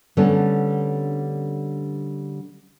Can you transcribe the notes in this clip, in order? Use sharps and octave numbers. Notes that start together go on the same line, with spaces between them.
D3 G3 A3 B3 C#4 D4